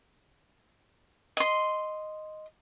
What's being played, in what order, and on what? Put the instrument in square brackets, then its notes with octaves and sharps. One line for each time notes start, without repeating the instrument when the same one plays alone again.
[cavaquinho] D#5 C6